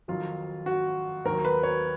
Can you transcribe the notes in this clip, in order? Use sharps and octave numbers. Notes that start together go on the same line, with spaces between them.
F2 D#3 F#3 F4
F#4
D#2 D#3 F#3 A#4
B4
C#5